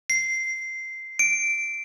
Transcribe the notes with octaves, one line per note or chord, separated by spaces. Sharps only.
C7
D7